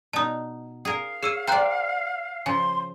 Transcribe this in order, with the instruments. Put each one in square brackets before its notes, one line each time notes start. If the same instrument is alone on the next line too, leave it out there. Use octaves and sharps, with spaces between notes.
[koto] B2 D#4 [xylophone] A5 D#6
[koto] G#4 A#4 [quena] F5
[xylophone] G#4 E6 D#7 [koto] C#5
[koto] C5 D5 [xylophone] G5 A#5 F#6
[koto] C#3 F3 [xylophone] G#5 [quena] C6